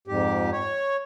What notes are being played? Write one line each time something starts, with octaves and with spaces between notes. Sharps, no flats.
F2 G#2 G4
C#5